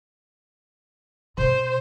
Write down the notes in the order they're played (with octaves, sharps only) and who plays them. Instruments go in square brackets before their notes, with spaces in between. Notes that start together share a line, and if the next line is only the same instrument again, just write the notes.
[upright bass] B2 B3 [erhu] C5